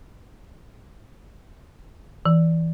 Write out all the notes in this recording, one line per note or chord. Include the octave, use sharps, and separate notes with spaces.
E3